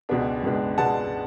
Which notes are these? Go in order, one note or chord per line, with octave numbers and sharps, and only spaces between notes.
C#2 B2 G#3 B3 D4
C#2 B2 G#3 B3 D4
C#2 B2 G#3 B3 D4 F#5 A5